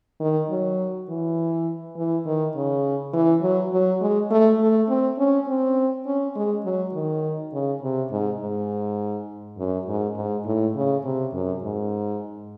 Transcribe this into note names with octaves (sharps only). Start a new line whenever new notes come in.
D#3
F#3
E3
E3
D#3
C#3
E3
F#3
F#3
G#3
A3
A3
C4
C#4
C4
C#4
G#3
F#3
D#3
C#3
C3
G#2
G#2
F#2
G#2
G#2
A2
C#3
C3
F#2
G#2